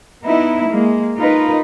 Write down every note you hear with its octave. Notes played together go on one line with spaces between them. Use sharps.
B3 D#4 E4
G#3 A#3
D#4 F4 A#4 B4